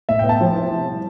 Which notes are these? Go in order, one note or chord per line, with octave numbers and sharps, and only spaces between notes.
A2 E5
B3 G5
A5
F3
E4
C3
G3